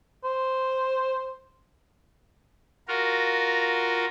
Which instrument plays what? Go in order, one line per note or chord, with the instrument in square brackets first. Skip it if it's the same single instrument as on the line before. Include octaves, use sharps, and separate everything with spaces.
[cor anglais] C5
[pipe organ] F4 F#4 A#4